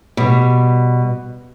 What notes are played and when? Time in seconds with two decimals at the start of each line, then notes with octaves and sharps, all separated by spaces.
0.17 B2 G3